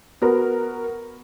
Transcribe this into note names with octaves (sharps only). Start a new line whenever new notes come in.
B3 F#4 A#4